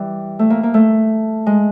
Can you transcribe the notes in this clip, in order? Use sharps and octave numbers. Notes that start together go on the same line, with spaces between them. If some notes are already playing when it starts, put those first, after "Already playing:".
Already playing: E3 G3
A3
A#3
A#3
A3
G#3